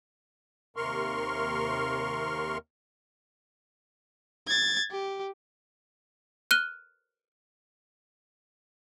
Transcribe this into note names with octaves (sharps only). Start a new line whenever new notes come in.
D#2 C3 A#4 C6 C#6 F6
G#6 A6
G4
F6 F#6 D#7 G7